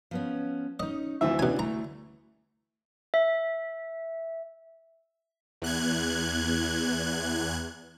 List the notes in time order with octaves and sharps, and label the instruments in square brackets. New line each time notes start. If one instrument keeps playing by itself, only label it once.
[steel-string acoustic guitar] F3 B3 C#4
[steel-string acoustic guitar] C#4 D#4 [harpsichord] D#5
[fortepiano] D2 E3 E5 [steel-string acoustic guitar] F3 C4 F4
[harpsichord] B2 G#5 [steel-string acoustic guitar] C#4 D4
[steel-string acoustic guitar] A3 [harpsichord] A#5
[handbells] E5
[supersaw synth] E2 F#6 G#6